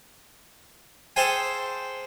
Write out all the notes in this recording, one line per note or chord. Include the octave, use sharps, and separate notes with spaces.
G#4 A4 C5 F5 G5 G#5